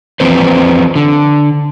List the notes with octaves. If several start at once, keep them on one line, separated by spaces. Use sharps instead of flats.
E3 F3 C4 B4 C5
D3